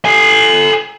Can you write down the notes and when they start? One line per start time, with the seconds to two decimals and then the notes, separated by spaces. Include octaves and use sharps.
0.05 A4 G#5